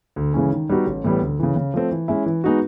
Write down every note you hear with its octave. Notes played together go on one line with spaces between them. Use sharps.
D2
C#3 E3 G#3 C#4
D#3
G3 B3 D#4 F#4
A1
A2 E3 G3 B3
D2
C#3 E3
C#3
F3 A3 C4
E3
G#3 C#4 E4
E3
G#3 B3 D#4 F#4